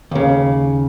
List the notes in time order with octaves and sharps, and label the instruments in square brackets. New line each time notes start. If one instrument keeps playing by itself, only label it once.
[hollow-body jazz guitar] D#2 C#3